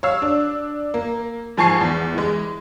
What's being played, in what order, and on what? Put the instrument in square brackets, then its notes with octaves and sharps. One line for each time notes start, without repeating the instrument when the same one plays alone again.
[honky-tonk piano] C#5 F5 E6
D4
A#3
G#2 F3 G#5 A5 C#6 C7
E2
E3 G#3